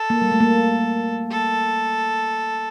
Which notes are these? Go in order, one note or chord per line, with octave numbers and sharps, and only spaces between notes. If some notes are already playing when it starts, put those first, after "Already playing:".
Already playing: A4
A#3
G3
A3
A#3
A4